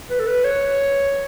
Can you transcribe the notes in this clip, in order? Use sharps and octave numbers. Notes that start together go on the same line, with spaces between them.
B4
A4
B4
C#5